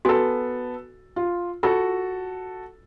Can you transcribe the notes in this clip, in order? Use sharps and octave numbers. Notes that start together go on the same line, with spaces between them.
B3 F#4 A4 G#5
F4
F4 F#4 A4